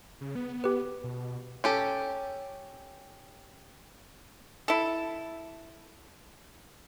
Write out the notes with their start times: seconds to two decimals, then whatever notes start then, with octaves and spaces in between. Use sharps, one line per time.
0.21 C#3
0.35 B3
0.64 G4 B4
1.04 B2
1.64 C#4 G4 A4
4.68 E4 A4